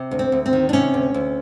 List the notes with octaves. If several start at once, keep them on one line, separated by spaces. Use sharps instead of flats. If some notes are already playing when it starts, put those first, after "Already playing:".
Already playing: C3
D2
C4
D2
C4
D#3
D4
C3 C#4
D2
D2